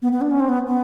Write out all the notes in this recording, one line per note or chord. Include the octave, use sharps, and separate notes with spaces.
B3
B3
D4
C#4
C4
B3
B3